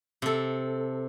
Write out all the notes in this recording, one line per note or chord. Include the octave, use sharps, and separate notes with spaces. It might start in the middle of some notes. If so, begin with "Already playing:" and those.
C3 A4